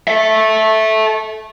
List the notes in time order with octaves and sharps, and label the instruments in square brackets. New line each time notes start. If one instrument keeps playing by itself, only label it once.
[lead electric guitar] A4 E5